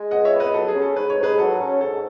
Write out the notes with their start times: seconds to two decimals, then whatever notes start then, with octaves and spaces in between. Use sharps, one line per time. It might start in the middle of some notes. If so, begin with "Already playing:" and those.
Already playing: G#3
0.11 C#2 D#5 F#5
0.25 C#5 E5
0.33 B3
0.40 B4 D#5
0.54 F#3 A4
0.68 G#4
0.75 C#4
0.82 A4
0.96 G#2 B4
1.10 C#5
1.17 G#2
1.23 G#4 B4
1.38 F#3 A4
1.60 C#4
1.81 G#2 A4